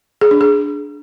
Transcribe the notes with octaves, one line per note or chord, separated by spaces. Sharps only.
G#4
D4
G#4